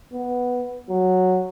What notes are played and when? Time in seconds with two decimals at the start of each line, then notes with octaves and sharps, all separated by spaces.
0.13 B3
0.90 F#3